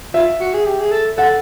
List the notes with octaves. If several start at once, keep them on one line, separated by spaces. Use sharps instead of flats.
F4 E5
F#4
G#4
G4
G#4
A4
A4 F#5